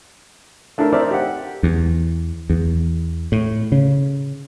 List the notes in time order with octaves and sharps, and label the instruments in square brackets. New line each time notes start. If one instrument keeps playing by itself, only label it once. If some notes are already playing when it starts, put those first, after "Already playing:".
[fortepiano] A3 D4 E4 A4 A#4
C4 D#4 A#4 D5 E5
G4 F#5
[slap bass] E2
E2
A2
C#3